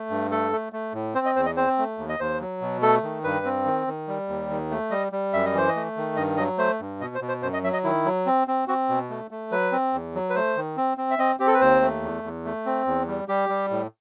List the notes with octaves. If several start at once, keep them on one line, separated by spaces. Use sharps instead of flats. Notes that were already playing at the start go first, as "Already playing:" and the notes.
Already playing: A3
G2
A3 A4
A3
A3
A2
C4 C5
D#5
E2 C5
D#5
C4 C5
A3
D#2
D#5
D#2 C5
F#3
B2
A3 A4
D#3
G2 B4
C4
D#3
D#3
G3
D#2
D#3
A3
G3 D#5
G3
F#2 E5
D#5
E3 C5
D#5
A3
D#3
G2 D#5
F#3 D#5
A3 C5
G2
B2 D#5
C5
B2
C5
F#2 C5
D#5
F#3 E5
D#5
D#3 E4
F#3
C4
C4
C4 F#4
B2
A3
A3
F#3 B4
C4
E2
F#3
B4
A3 C5
D#3
C4
C4
E5
C4 D#5
C4 G4
A4
B4
D#2 C5
A3
E2
E2
A3
C4
E2
G3
G3 G4
G3
A2